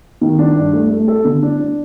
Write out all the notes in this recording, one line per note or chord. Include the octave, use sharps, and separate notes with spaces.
D#3
D4
G2
A3
A3
A4
D3
D4
D4